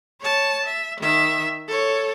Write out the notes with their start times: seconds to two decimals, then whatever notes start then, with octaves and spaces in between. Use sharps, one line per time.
0.21 C#5 A5
0.66 E5
1.01 D#3 E5
1.68 A4 C#5